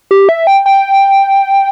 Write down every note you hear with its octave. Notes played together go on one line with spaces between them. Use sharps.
G4
E5
G5
G5